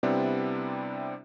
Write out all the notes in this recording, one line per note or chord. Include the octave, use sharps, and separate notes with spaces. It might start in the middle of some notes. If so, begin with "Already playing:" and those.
C3 G3 B3 C4 D4 E4